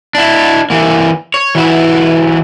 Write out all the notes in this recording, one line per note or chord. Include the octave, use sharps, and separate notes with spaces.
D4 E4
E3 A#3
C#5
E3 F#3 E4